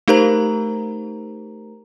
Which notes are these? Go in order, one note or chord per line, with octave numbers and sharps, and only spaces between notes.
A3 D#4 G4 A#4 C5 A#5